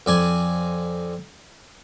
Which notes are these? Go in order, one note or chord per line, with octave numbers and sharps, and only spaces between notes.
F2 D5 G#5